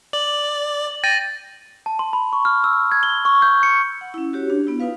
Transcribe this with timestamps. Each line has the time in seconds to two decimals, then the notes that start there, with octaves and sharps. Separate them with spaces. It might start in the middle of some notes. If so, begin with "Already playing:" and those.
0.13 D5 F#7
1.04 G5 A6 A#6 D#7
1.86 A5
1.99 C6
2.13 B5
2.33 C#6
2.45 F6
2.64 E6
2.92 G#6
3.03 G7
3.25 C#6
3.42 G6
3.63 C#7
4.01 F#5
4.14 C#4 E4
4.33 F#4 G4 C#5
4.50 D4
4.67 B3 E4
4.80 D#4 F4 B4 F5